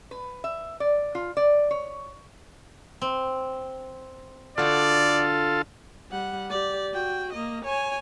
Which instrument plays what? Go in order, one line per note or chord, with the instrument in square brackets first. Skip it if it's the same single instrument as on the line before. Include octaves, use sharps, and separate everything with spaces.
[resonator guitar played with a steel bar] B4
E5
D5
F4
D5
C#5
[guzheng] C4
[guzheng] D3 F#4 [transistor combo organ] F4 A4 [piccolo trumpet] D5
[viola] G3 F#5
G4 D5
F#4 G5
A#3 D#5
C#5 G#5